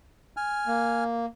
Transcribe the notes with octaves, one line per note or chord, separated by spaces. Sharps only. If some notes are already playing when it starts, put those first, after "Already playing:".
G#5 F6
A#3